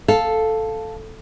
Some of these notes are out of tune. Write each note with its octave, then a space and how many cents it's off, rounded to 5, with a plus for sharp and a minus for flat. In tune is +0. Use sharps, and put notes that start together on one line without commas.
A4 +0 F5 +5